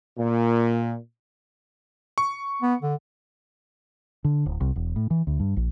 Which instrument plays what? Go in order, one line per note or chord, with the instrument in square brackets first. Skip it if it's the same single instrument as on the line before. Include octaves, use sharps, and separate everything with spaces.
[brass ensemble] A#2
[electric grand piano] C#6
[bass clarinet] B3
D3
[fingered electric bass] D3
D1
C2
E1
A2
E3
D2
G2
A#1